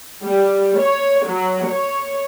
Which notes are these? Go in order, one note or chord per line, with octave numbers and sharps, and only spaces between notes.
G3
C#5
F#3
C#5